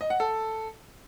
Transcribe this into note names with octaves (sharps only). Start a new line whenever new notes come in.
D#5
F#5
A4